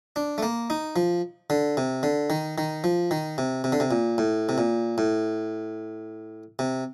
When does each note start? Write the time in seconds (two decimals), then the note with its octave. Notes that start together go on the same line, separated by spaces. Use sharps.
0.16 D4
0.38 A3
0.43 A#3
0.70 D#4
0.96 F3
1.50 D3
1.77 C3
2.03 D3
2.30 D#3
2.58 D#3
2.84 F3
3.11 D#3
3.38 C3
3.64 C3
3.72 D3
3.80 C3
3.91 A#2
4.18 A2
4.49 C3
4.58 A#2
4.98 A2
6.59 C3